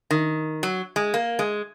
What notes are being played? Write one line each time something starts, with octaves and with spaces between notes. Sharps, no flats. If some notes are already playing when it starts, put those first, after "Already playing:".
D#3
F#3
G#3
A#3
G#3